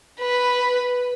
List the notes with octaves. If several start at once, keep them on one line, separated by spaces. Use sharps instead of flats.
B4